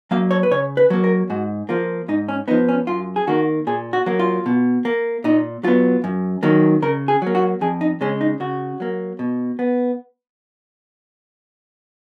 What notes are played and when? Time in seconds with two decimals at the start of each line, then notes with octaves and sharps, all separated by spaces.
0.11 F#3 A#3 F5
0.31 C#5
0.43 B4
0.51 C#3 C#5
0.77 B4
0.90 F#3 A#3
1.04 A#4
1.30 G#2 F#4
1.69 F3 A#3 F4
2.08 G#2 D#4
2.28 C#4
2.48 F3 B3 D#4
2.68 C#4
2.87 F#2 F4
3.16 G#4
3.27 D#3 A#3 F#4
3.67 A#2 G#4
3.93 F#4
4.06 F#3 A#3
4.19 F4
4.46 B2
4.85 A#3
5.24 A#2 D#4
5.63 F#3 B3 F4
6.04 F#2
6.43 D#3 F#3 A#3
6.82 C#3 A#4
7.08 G#4
7.22 F#3 A#3
7.35 F#4
7.61 F2 G#4
7.81 D#4
8.01 C#3 G#3 C#4
8.21 D#4
8.40 C#3 F#4
8.80 F#3 A#3
9.19 B2
9.59 B3